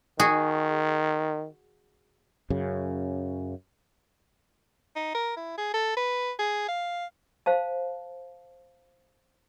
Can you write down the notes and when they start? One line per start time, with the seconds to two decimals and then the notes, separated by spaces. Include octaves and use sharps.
0.20 D#3 F#4 G#4
2.50 F#2 C#3
4.96 D#4
5.15 A#4
5.37 E4
5.58 G#4
5.74 A4
5.97 B4
6.39 G#4
6.68 F5
7.46 C5 F5 A5